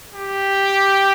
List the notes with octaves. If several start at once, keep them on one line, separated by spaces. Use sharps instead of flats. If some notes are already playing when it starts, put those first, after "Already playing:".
G4